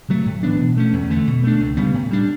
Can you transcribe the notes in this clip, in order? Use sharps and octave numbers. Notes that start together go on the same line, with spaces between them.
C#3 F#3 A3
A2
E3 B3 D4
B2
A3 C#4
E2
D3 A3
B2
A3 D4
C#2
C#3 G3 B3
A2
G3 D4